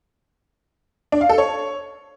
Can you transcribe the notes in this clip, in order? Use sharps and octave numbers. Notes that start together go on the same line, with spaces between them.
D4
F5
A4
C#5